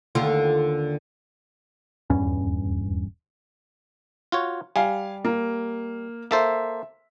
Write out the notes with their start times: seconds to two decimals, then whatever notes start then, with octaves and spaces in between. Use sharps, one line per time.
0.15 D#2 D3 F4
2.10 D#1 E2 G2 C#4
4.32 F4 F#4 C#5
4.76 G3 F5 G#5
5.24 A#3
6.31 A#3 A4 C5 E5